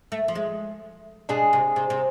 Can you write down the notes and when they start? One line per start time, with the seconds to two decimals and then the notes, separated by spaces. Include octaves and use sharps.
0.12 A3
0.28 F3
0.35 G#3
1.29 B2 G#3 D4 G#4
1.53 C3
1.76 C3
1.90 C3